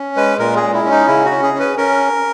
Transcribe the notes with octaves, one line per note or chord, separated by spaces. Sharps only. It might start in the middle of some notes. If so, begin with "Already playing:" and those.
Already playing: C#4
G#3 B4
A#2 A#4
G#4
G#3
E4
C#4
D#4
C#3 E4
F#4
C#4
G#4
C#4
B4
C#4 A#4